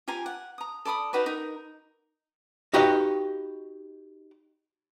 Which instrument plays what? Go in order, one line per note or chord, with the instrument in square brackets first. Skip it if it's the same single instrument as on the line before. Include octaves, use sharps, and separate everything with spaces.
[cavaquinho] F4 G4 G#5 A#5
F#5
A#5 D#6
A4 D5 B5 D#6
D#4 F#4 B4 D5
D#4 A#4
[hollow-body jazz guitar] D#4 F#4 G4 B4 D#5 F5